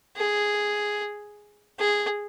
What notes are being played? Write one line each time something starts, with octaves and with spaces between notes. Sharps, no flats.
G#4
G#4